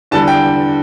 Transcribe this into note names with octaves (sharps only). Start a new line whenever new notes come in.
E2 D3 G3 A5
G5